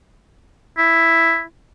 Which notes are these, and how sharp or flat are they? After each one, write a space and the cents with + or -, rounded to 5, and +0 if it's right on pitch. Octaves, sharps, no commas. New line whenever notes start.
E4 +5